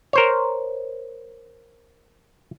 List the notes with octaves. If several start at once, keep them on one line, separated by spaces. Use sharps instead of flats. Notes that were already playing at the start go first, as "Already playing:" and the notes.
A#4 C5 C#5